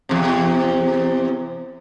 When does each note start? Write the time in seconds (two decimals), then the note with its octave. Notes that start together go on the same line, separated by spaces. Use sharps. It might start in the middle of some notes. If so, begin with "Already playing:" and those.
0.09 E2 C3